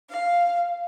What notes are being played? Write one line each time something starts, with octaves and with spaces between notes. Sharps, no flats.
F5